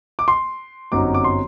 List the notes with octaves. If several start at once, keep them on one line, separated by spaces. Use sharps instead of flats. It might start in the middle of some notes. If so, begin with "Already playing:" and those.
D6
C6
G1 F#2 F#3 C4 D#4 D6
D6
C6